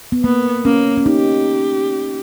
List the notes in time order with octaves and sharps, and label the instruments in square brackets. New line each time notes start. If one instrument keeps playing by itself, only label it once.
[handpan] B3
[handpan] A#3 [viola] B3
[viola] A#3 [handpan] C#4
[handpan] C#4
[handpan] D#4 [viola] G4